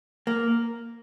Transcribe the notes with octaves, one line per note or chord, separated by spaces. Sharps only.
A#3